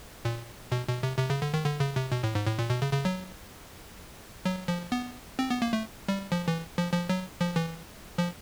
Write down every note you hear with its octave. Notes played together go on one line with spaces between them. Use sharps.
A#2
B2
B2
C3
C3
C#3
D3
D#3
D3
C#3
C3
B2
A2
G#2
A2
A#2
B2
C#3
C#3
F#3
F#3
F3
B3
C4
B3
A#3
A3
G3
F3
E3
F3
F3
F#3
F3
E3
F3